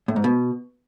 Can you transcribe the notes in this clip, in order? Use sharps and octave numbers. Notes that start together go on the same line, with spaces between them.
A2
G#2
B2